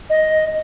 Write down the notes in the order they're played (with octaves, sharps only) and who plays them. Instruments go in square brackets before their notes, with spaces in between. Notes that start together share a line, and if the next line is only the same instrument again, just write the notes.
[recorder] D#5